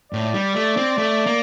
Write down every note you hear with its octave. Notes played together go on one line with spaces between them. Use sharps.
A2 D5
G3
A3
C4
A3
A#3